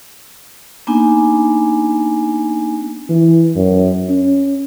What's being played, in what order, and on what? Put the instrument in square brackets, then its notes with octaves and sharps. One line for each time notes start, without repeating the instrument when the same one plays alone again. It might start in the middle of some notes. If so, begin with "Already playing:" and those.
[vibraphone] A#3 B3 D4 D#4 G#5
[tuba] E3
F#2
C#4